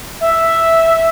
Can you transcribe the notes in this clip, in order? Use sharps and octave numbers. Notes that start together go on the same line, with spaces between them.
E5